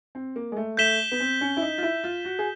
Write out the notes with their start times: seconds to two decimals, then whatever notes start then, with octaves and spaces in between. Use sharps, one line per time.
0.15 C4
0.36 A#3
0.52 G#3
0.56 A3
0.77 A3 G6 B6 E7 G7
1.12 B3
1.20 C4
1.41 C#4
1.57 E4
1.62 D#4
1.78 F4
1.83 E4
2.04 F4
2.25 F#4
2.39 G#4